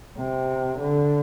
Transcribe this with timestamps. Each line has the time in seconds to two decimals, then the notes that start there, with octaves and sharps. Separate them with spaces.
0.17 C3
0.78 D3